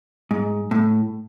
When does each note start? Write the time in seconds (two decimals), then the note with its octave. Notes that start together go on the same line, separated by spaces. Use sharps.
0.31 G#2
0.71 A2